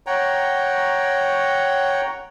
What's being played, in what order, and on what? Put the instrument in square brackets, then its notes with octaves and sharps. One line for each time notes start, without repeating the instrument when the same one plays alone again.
[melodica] C#5 F#5 G5 A#5